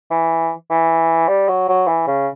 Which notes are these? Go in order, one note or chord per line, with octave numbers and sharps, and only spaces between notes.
E3
E3
G3
F#3
F#3
E3
C#3